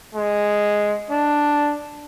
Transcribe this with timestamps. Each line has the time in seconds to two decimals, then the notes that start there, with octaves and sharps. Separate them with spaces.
0.15 G#3
1.11 D4